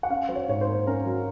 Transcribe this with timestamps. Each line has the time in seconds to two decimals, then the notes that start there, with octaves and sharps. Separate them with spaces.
0.03 F#5
0.10 C#4 F5
0.28 F#3 C5
0.36 C#5
0.48 G#2 C#5
0.61 C5
0.67 A#3
0.87 C#4 A#4
1.06 F#3